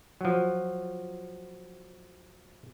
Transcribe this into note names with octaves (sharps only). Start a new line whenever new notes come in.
F3 F#3